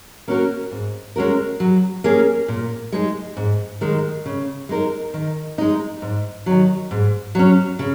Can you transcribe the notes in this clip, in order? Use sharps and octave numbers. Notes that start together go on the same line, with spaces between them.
A#3 C#4 F#4 A#4
G#2
G#3 C#4 F#4 A#4
F#3
A#3 C#4 G#4
A#2
G#3 D#4 G#4
G#2
D#3 G#3 D#4
C#3
G#3 D#4 A#4
D#3
G#3 D#4
G#2
D#3 F#3
G#2
F#3 C#4
C#3